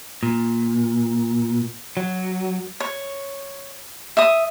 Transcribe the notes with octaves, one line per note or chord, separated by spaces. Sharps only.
A#2
F#3
C#5
E5 D#6